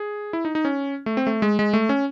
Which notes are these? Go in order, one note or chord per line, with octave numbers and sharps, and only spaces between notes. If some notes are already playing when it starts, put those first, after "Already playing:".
Already playing: G#4
E4
D#4
D#4
C#4
A3
C4
A3
G#3
G#3
A3
C#4